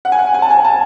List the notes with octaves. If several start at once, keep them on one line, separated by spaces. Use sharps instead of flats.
F#5
G#5
F#5
G#5
A5
G#5
A5